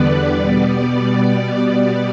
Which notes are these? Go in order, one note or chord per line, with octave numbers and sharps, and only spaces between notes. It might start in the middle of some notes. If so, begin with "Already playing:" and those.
Already playing: E2 D3 G3 B3 B4 D5
B2 G3 B3
D5
D5